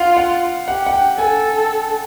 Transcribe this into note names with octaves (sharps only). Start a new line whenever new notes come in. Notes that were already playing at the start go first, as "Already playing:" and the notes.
Already playing: F4 F5 F#5
F#5
G4 F#5
F#5
G5
A4 G#5